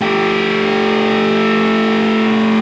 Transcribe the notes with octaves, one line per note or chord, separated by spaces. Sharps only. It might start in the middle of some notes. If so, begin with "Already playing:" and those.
A3 G4